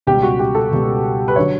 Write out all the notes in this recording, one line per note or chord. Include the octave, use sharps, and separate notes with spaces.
C#2 B2 G3 G4
F#4
G4
A4
C#2 B2 G3
B4
D3 F#3 C#5